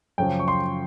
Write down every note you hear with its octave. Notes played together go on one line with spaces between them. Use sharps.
F#2 C#3 F3 G5
C#6
C6